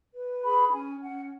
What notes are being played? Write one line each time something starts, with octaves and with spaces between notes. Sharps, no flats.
B4
G#4 B5
C#4 G#5
C#4 F#5